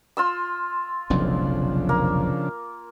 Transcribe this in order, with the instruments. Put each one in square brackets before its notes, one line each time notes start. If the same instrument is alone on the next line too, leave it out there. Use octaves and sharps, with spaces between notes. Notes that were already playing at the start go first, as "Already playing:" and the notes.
[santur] F4 C6 E6
[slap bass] F1 B1 F2 [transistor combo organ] C#3 F3 D4
[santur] A#3